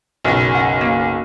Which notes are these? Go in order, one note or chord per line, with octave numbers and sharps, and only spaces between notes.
F#1 B1
F#5
A#3